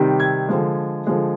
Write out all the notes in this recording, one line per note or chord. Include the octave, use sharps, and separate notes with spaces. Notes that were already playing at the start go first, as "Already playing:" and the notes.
Already playing: C3 D#3 G3
G#6
D3 F3 G#3
D3 F3 G#3